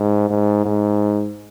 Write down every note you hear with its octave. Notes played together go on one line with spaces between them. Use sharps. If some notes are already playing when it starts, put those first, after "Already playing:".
Already playing: G#2
G#2
G#2